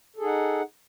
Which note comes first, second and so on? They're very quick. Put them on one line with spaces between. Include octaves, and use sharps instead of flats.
A4 G#4 D#4 F#5